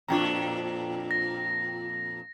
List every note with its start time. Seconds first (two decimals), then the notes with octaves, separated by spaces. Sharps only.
0.08 F2 A#2 D4 F4 G5 A#5
1.11 A#6